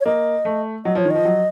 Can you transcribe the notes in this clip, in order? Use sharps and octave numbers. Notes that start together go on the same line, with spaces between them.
C#5
A#3 D#5
A3
F#3 D#5
F3 C#5
D#3
F3 D#5
F#3